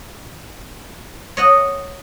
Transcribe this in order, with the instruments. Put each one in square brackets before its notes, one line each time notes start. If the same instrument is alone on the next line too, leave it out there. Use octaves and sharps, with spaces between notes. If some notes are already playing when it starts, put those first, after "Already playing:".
[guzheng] C#5 D#5 F#5